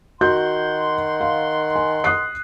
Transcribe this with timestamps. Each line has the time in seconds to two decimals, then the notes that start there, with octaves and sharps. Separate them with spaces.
0.21 D#3 F#4 F#5 C6 G6
1.21 F5
1.76 G#5
2.04 D#6 F#6 C7